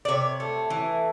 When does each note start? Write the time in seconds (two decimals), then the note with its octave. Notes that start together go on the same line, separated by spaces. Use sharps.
0.05 D5
0.08 C3 C#5
0.40 A3
0.70 E3